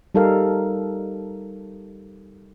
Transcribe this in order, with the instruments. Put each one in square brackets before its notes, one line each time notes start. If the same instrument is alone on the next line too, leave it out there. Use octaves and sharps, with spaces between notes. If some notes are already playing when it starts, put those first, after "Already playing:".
[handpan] G3 D#4 A4 A#4 F5